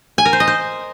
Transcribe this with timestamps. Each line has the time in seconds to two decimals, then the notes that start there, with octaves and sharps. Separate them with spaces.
0.18 G#5
0.25 A#4
0.33 C5
0.40 D#5
0.48 C5